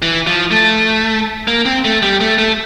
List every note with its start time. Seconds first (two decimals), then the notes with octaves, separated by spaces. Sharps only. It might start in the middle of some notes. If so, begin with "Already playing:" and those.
0.02 E3
0.27 F3
0.51 A3
1.48 A#3
1.65 C4
1.85 A3
2.02 G3
2.21 A3
2.38 A3